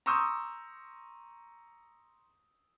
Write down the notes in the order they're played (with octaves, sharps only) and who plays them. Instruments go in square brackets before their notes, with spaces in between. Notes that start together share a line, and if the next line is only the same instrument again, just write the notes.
[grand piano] A#5 C6 C#6 D#6 E6 G6